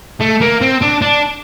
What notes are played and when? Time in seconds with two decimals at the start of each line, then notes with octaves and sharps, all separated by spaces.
0.20 A3
0.41 A#3
0.61 C4
0.82 D4
1.02 D4